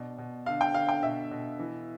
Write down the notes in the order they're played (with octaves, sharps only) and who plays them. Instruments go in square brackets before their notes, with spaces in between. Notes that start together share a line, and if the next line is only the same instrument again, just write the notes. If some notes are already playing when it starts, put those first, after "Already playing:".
Already playing: [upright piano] B2 D4
B2
D3 F5
G5
D3 F5
G5
B2 E5
B2
E3